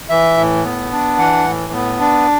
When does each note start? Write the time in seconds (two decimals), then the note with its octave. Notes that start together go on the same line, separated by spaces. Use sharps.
0.09 E3 E5
0.37 A2
0.64 B3
0.91 D4
1.18 E3 F#5
1.45 A2
1.73 B3
2.00 D4